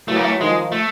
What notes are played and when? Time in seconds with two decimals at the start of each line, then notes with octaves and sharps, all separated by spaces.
0.08 E3 F#3 A3
0.16 A#3
0.24 A3
0.40 D#3 F3 G#3
0.72 A3